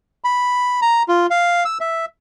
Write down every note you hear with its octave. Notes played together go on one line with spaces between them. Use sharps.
B5
A#5
F4
F5
E6
E5